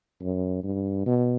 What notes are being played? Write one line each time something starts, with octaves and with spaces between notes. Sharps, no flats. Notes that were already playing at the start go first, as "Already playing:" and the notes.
F#2
G2
B2